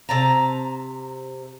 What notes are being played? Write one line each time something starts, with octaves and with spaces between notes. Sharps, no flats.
C3 A5 A#5